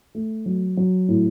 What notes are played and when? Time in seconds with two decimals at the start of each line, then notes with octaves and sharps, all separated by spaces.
0.15 A3
0.46 F#3
0.77 F#3
1.08 A2